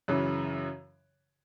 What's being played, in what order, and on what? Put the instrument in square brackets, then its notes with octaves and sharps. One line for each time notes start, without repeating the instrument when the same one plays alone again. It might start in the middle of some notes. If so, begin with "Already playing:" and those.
[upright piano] F#2 C#3 E3